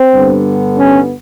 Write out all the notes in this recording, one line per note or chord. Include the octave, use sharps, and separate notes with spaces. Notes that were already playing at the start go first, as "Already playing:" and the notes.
Already playing: C4
G2 D3 G3 B3
C#4